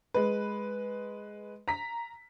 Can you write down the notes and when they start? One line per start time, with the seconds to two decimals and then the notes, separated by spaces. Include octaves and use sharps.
0.14 G#3 B4
1.68 A#5 B6